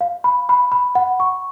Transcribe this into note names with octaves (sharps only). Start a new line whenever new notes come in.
F5
B5
B5
B5
F#5
C#6